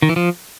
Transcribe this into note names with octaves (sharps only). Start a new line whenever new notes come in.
D#3
E3
F3